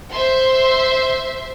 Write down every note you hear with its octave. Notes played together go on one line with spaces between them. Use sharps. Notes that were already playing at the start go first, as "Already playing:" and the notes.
C5 E5 C6